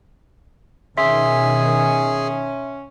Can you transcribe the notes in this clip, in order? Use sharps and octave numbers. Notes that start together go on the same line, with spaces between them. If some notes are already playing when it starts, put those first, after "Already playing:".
B2 D#3 C#4 G#4 E5 C6